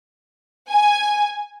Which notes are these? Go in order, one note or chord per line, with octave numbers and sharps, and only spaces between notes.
G#5